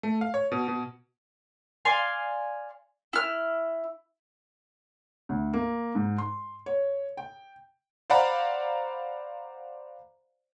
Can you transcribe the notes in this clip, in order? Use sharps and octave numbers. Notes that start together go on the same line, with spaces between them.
A3
F5
C#5
B2
B2
D5 F5 G#5 C6
E4 F6
D2
A#3
G#2
C6
C#5
G5
C5 D5 F5 F#5 A#5 B5